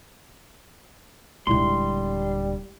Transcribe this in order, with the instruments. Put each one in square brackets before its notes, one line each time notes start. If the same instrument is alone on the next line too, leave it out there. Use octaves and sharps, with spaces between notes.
[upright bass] D#1 D3 [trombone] G3 [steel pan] G#3 E4 [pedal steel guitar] C6